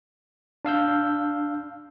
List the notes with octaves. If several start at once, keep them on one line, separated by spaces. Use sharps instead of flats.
D4 F5 E6 G6